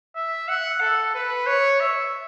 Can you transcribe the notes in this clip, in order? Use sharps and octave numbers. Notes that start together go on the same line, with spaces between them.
E5
F#5
A4
B4
C#5
E5